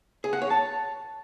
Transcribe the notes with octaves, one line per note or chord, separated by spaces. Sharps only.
G#4
F#5
C#5
A5